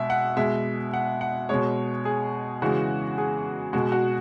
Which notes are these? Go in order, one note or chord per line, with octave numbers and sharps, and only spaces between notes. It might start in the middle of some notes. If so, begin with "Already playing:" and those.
Already playing: B2 G#3 E5
F#5
B2 G#3 E5
F#5
F#5
B2 G#3 C#5
G#4
C#3 E3 G#3 F#4
G#4
B2 G#3 F#4
F#4